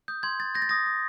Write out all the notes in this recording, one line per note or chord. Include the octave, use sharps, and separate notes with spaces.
D#6 G6
C6 G#6
D#6 A6
G6 A#6
A6
D#6 A#6
D#6